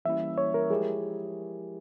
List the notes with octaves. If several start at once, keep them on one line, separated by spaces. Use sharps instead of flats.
E3 G3 A#3 C#4 E4 E5
C#5
A#4
F3 G#3 E4 G4 G#4